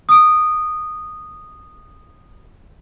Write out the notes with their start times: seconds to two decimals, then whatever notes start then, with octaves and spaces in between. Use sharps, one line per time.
0.09 D#6 D7